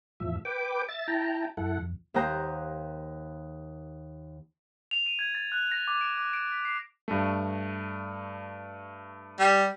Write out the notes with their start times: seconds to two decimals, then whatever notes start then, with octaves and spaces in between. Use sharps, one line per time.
0.20 E2 A2 F3 E5
0.45 B4 G5 D6
0.89 E5 A6
1.08 E4 G5 A5 A#5
1.57 F#2 E4 A4 F#5
1.79 F2
2.14 D#2 A#3 C5 F#5 A#5 G6
4.91 F7
5.06 D#7
5.19 G#6
5.35 A6
5.52 F#6
5.72 A#6
5.88 D6
6.01 D7
6.17 D6
6.33 D7
6.52 B6
6.65 C7
7.08 G2 A3
9.40 G3